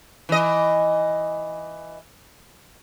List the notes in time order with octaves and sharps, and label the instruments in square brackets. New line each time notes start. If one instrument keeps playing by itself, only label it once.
[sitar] E3 D#5